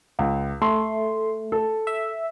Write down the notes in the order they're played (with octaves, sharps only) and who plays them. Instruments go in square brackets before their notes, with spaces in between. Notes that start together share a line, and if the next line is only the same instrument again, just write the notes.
[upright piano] C#2
[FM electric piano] A3 [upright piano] C6
[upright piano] A4
[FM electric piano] E5